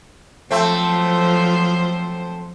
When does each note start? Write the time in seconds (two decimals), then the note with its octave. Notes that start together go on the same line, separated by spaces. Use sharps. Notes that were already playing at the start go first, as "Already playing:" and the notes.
0.51 F3 F#3 A3 C4 C5